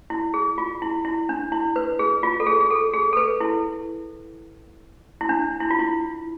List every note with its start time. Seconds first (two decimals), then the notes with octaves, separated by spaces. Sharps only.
0.10 E4
0.34 G#4
0.58 F4
0.82 E4
1.05 E4
1.29 D4
1.52 E4
1.76 B4
1.99 G#4
2.23 F4
2.40 A4
2.47 G#4
2.60 G#4
2.70 A4
2.94 G#4
3.13 A4
3.17 B4
3.40 E4
5.21 E4
5.29 D4
5.60 E4
5.71 F4
5.79 E4